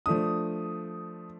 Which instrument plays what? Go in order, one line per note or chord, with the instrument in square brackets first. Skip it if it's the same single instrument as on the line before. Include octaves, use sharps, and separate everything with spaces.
[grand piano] F3 A3 D4 [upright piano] D#6